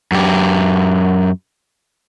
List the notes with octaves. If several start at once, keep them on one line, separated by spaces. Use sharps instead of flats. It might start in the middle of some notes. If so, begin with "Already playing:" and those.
F#2 G4